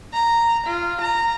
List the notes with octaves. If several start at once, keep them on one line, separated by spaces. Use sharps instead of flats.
A#5
F4
A#5